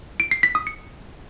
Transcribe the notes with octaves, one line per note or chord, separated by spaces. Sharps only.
D7
C7
B6
D#6
C#7